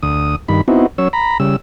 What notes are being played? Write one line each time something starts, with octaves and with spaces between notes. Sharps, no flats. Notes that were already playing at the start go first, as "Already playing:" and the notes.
D2 D#6
G2 D#3 B5
B3 C4 D#4 E4 F#4
F#3 C#4 C#5 E6
A#5 B5
C#3 G3 E6